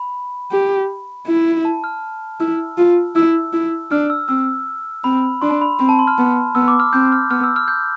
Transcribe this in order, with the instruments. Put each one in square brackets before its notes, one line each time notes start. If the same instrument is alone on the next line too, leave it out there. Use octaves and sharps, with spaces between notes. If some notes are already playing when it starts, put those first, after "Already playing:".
Already playing: [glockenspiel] B5
[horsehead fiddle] G4
E4
[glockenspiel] A5
F6
[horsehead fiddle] E4 [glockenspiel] E6
[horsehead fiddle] F4
[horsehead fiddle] E4 [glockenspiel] E6
[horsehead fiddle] E4
[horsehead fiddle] D4 [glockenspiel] F6
[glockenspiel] E6
[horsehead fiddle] C4 [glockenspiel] E6
[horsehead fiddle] C4 [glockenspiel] B5
[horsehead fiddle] D4 [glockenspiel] C6
[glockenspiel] B5
[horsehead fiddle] C4 [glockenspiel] B5
[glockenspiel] A5
C6
F6
[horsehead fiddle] B3
[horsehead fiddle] B3 [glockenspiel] E6
[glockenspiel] D6
F6
[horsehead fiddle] C4 [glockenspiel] G6
[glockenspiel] F6
[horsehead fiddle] B3 [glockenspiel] F6
[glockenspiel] E6
F6
G6